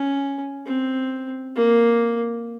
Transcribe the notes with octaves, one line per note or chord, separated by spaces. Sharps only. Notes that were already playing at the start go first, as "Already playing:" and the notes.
Already playing: C#4
C4
A#3